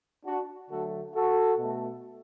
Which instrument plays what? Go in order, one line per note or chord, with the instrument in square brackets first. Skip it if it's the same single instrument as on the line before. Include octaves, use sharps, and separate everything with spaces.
[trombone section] D4 F#4
D3 F#3 A3 F#4 A4
F#4 A4
B2 A3